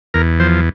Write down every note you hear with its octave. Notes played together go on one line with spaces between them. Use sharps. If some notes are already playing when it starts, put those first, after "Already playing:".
E2 A#4
F3 C5